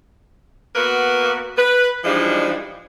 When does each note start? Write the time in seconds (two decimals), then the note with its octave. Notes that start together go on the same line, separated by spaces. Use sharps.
0.75 A#3 B3 F#4 A#4 B4
1.57 B4
2.04 E3 F3 G3 G#3 D4 D#4